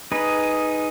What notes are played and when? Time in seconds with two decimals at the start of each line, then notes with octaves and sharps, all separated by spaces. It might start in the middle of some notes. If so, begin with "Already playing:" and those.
0.12 D#4 G#4 B4